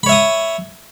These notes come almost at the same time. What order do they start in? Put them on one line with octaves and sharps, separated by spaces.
B5 C#5 E5 D#6